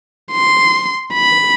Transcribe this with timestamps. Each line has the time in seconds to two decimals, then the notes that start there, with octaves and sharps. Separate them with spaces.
0.32 C6
1.14 B5